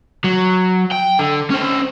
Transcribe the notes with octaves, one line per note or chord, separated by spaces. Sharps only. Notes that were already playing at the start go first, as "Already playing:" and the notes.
F#3
G5
D3
C#4 C5